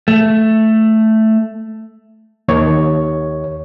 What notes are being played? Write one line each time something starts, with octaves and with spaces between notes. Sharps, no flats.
A3
D#2 C#5